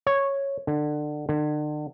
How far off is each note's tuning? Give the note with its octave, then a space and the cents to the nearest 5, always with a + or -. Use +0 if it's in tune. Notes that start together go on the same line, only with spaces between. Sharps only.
C#5 -5
D3 +25
D3 +40